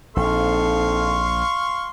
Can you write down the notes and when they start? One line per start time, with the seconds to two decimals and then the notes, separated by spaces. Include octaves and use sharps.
0.16 A#1 C4 D#4 A4 F5 C6 C#6